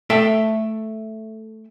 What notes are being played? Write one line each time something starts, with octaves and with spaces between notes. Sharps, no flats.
A3 A4 E5 G5